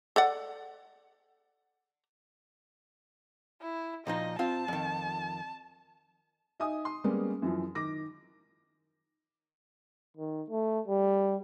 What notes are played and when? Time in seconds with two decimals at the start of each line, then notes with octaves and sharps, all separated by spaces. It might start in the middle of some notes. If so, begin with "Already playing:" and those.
0.16 A4 D5 F#5
3.62 E4
4.07 A#2 F3 D#4 D#5
4.39 C4 F4 F5 A5
4.68 F2 D#3
6.60 D#4 D#5 E5 G#5 D#6
6.85 C6
7.04 G3 G#3 A#3 B3 C#4 G#4
7.42 F#2 E3 F3
7.75 D#3 D6 A#6
10.17 D#3
10.50 A3
10.88 G3